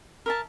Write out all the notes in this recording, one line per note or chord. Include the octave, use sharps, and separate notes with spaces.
A#4 E5 A5